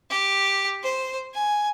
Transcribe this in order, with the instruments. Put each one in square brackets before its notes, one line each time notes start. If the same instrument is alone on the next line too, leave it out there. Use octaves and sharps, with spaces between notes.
[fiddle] G4
C5
G#5